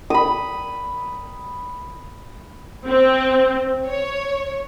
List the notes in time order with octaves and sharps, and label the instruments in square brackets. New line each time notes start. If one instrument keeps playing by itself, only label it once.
[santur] B5 D#6
[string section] C4
C#5